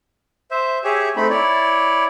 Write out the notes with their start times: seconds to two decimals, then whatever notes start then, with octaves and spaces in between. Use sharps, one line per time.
0.51 C5 E5
0.84 G4 G#4 C#5 E5
1.16 A3 C4 D#4 B5
1.30 E4 C#5 D5